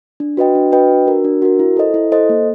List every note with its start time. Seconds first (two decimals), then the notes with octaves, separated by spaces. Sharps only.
0.20 D4
0.37 F#4 B4 D#5 G5
0.55 D4
0.72 F#4 B4 D#5 G5
0.90 D4
1.07 F#4 A#4
1.24 D4
1.42 F#4 A#4
1.59 E4
1.77 A4 C5 D#5
1.94 E4
2.12 A4 C5 D#5
2.29 A#3